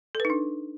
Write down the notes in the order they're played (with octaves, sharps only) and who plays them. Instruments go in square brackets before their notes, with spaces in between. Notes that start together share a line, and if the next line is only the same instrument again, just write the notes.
[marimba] A4
B4
D#4
D4